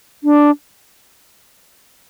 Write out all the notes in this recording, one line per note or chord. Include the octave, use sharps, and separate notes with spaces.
D4